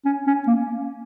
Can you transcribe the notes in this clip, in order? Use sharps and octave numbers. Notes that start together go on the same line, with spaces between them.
C#4
C#4
A#3